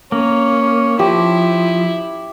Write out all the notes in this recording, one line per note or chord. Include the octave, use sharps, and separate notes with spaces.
A#3 C#4
F3 E4 G4